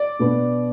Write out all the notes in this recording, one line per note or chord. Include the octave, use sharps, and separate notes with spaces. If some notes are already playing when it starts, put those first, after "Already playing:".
Already playing: D5
B2 B3 D4